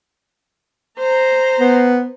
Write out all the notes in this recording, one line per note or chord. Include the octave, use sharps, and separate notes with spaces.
C5 A#5
B3